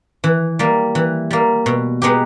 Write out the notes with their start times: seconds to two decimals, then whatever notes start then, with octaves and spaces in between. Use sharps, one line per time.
0.24 E3
0.59 G3 A#3
0.95 E3
1.31 G3 A#3
1.66 B2
2.02 G#3 B3 D#4 G4